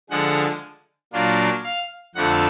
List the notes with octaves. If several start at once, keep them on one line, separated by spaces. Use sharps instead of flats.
D3 F3 G#3 F#5
A#2 F#3 A#3 D4 F4
F5
F2 D3 F3 A3 D4 F#5